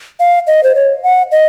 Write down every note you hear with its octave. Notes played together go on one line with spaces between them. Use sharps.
F5
D#5
C5
C#5
F#5
D#5